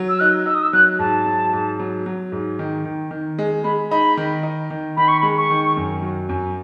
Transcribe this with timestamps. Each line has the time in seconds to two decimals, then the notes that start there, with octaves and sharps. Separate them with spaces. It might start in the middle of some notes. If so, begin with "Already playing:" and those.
Already playing: F#3
0.09 E6
0.20 D#4 F#6
0.46 D#4 E6
0.54 D#6
0.63 E6
0.73 F#3 F#6
0.99 G#2 A5
1.26 F#3
1.53 G#2
1.80 F#3
2.06 F#3
2.32 G#2
2.59 D#3
2.85 D#3
3.11 D#3
3.39 G#3
3.64 G#3 B5
3.91 D#4 B5
4.17 D#3
4.43 D#4
4.70 D#3
4.97 D#3 B5
5.08 C#6
5.20 G#3 B5
5.37 C#6
5.50 D#3
5.77 F#2
6.02 F#3
6.29 F#2